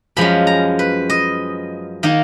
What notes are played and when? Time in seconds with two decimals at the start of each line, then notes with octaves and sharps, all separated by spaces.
0.17 F#2 F3 G#3 C#4 B5
0.47 A#5
0.79 B4
1.10 D#5
2.03 D#3 A#3 D#4